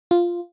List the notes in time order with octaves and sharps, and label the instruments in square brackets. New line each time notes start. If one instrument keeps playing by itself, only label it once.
[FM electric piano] F4